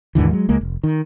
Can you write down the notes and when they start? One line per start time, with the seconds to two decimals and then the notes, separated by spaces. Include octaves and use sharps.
0.15 D#2 G#2 D3 E3
0.31 F#3 G#3
0.49 C#2 G#3 A#3
0.61 F1
0.84 D#3